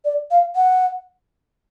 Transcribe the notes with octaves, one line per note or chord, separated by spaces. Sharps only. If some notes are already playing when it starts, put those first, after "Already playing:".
D5
F5
F#5